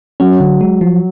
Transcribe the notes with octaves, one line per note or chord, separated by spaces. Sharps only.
F#3 C#4
D3
G#3
F3